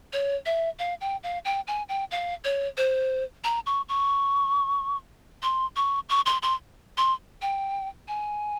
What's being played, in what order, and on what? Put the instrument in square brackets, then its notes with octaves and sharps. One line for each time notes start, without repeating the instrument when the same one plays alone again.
[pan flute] C#5
E5
F5
G5
F5
G5
G#5
G5
F5
C#5
C5
A#5
C#6
C#6
C6
C#6
C#6
C6
C6
C6
G5
G#5